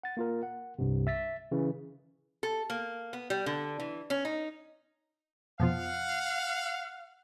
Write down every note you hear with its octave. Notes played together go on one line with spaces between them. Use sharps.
F#5 A6
A#3 F4 A#4
F#5
C2 G2 C3
E5 A6 B6
C#3 E3
A4
A#3
B3
G3
D3
E3
C#4
D#4
F2 B2 F3 F5 F#5